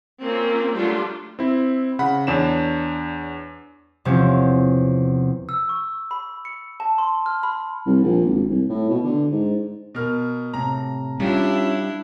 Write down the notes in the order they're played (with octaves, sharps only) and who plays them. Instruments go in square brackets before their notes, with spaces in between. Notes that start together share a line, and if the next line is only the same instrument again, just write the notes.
[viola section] A#3 C4 C#4 F4
F#3 G3 A3 D4 F4 G4
[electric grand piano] C4 E4
C#3 F#5 B5
E2 D4 C#5 E7
[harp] E2 C3 F3 C4 C#4
[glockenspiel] E6
C#6
B5
C#7
A5
C6
F6
B5
[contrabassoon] C2
A#1
G#1
C2
A2
B2
D3
G#2
[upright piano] B2 A#4 F6
[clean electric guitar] A2 C3 [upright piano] A#5
[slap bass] G3 [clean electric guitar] C#4 F4 G4 [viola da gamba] D4 E4